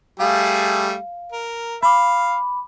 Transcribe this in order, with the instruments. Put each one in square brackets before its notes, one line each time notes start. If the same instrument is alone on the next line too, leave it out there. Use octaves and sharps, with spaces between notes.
[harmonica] G3 A3 G#4 [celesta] F5
[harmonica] A#4
[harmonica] F5 [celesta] B5 D6